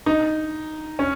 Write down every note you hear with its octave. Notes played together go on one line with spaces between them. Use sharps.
D#4
C#4